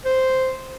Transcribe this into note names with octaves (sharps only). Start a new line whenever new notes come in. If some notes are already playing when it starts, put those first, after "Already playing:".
C5